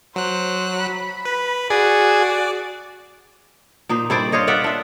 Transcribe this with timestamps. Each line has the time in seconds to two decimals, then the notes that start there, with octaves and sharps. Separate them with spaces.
0.16 F#3 C5 F#6
0.80 B5
1.25 B4
1.70 F#4 G#4 D5
3.89 A#2 D#4 C5
4.10 G2 E4 C5 D5
4.32 F4 C5 C#5 D#5
4.47 F4 D5 E5 F#5
4.64 D4 E5